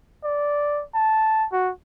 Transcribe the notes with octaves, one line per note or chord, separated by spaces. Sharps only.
D5
A5
F#4